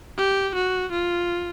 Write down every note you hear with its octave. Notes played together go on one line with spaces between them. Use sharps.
G4
F#4
F4